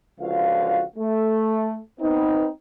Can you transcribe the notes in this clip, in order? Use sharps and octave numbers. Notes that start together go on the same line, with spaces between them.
C#2 D3 F3 F#4 F5
A3
B3 C4 D#4